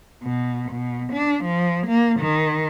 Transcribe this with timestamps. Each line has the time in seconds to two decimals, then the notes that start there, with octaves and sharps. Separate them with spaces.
0.23 B2
0.71 B2
1.13 D4
1.44 F3
1.87 A#3
2.20 D#3